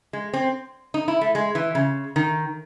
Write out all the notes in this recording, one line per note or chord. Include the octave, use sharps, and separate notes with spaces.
G#3
C4
D#4
E4
A3
G#3
E3
C#3
D#3